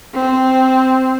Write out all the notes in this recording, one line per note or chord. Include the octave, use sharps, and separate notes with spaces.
C4